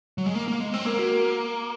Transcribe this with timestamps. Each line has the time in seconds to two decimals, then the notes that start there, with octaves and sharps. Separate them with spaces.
0.18 F#3
0.26 G#3
0.35 A#3
0.48 A#3
0.60 G#3
0.74 C4
0.86 A#3 A#4
0.99 F#4
1.12 A#4